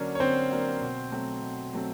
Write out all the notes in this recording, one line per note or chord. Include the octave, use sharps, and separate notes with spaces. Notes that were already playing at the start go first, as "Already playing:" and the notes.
Already playing: D3 F#3 A#3 C#4 D4 C#5
C#5
D3 C4 C5
F#3 A#3 D4
B2
F#3 A3 C4
B2
F#3 A3 C4